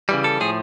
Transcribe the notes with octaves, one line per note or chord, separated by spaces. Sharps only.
C#3 E3 G3
A4
A2 F3 G#4